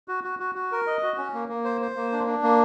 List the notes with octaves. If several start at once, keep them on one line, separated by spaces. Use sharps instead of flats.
F#4
F#4
F#4
F#4
A#4
D#5
F#4
C#4
A#3
A#3
C5
C5
A#3
D4
D4
A#3